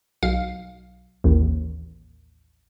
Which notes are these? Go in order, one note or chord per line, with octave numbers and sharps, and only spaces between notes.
B1 F5
A1 D#2